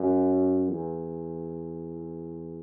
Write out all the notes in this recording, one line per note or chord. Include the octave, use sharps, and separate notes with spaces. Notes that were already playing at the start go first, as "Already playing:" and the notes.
Already playing: F#2
E2